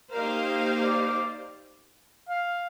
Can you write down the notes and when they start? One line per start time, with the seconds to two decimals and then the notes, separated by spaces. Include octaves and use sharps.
0.11 A#3 D#4 G4 A#4 C5 F5
0.84 D5
2.29 F5